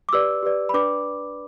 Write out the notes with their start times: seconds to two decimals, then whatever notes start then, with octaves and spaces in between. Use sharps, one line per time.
0.09 D6
0.13 G4 B4 D5 E6
0.43 G4 B4 D5
0.69 B5
0.74 D4 B4 D5 D6